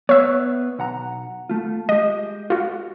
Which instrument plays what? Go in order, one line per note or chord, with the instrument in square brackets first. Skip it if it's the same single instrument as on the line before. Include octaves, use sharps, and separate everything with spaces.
[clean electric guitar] B3 [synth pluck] C#5 E5
[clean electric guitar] B1 F#5 A#5
A3 F4
[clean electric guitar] G#3 G4 [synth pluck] D#5
[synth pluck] F4 F#4